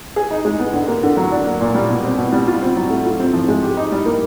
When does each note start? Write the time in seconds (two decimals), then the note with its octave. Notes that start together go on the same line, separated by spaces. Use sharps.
0.16 G#4
0.31 D#4
0.45 G#3
0.60 B3
0.74 D3
0.88 A#3
1.03 D3
1.17 F#3
1.31 D4
1.46 A#3
1.61 A#2
1.75 G3
1.90 B2
2.04 C4
2.18 B2
2.33 G3
2.48 F4
2.62 C4
2.76 F#3
2.90 A3
3.06 F4
3.20 C4
3.34 F3
3.49 G#3
3.62 G4
3.77 D#4
3.92 G3
4.06 A#3